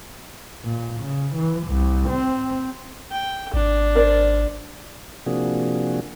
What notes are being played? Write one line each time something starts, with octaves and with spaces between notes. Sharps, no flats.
A#2
C#3
E3
C2
C4
G5
G#1 D4
A#4 C5 D5
C3 F3 A#3 D4 F#4 G#4